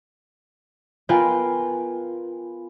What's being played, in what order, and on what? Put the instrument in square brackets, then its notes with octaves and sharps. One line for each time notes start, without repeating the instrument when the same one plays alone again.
[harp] B3 F4 A#4 B4 G5 G#5